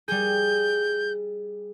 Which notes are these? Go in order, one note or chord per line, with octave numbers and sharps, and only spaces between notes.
G3 G#4 G6